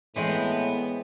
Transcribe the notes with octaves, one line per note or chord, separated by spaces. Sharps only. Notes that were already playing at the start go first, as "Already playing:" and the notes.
A2 E3 G#3 B3 C4